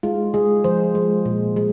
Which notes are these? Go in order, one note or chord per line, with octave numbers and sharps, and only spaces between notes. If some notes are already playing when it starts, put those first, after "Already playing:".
G#3 F4
G#3 G#4
F3 C5
G#3
A#2
G#3